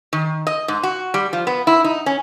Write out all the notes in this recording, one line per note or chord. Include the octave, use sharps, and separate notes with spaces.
D#3
D#5
G#2
F#4
G3
F3
B3
E4
D#4
C#4